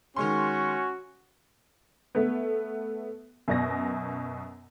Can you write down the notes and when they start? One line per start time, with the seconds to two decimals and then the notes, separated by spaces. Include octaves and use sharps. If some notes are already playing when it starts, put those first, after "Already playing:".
0.16 D#3 G#3 C#4 F#4 C6
2.15 A3 B3
3.48 F#2 B2 A#6